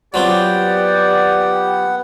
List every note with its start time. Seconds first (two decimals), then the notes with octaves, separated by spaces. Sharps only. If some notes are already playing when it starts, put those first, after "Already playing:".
0.14 F#3 B3 C4 F4 G4 D5 F#5